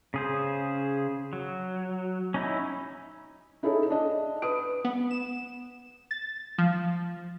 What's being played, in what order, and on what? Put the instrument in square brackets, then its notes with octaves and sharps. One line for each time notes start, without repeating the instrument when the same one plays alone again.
[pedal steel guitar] C#3 G#4 C5
F#3
C#4 D#4 E4
[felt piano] D#4 E4 G#4 A4 C#5
D4 D#5
B4 D#6 D7
[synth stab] B3
E7
A6
F3